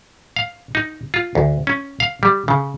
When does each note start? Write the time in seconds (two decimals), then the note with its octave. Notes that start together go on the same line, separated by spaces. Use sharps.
0.36 F5
0.75 D#4
1.14 F4
1.35 D2
1.67 C#4
2.00 F5
2.23 G3
2.48 C#3